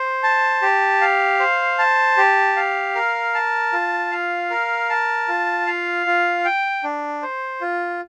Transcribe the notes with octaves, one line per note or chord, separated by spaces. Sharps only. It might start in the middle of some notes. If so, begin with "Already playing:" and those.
Already playing: C5
A5
G4
F5
C5
A5
G4
F5
A#4
A5
F4
F5
A#4
A5
F4
F5
F4
G5
D4
C5
F4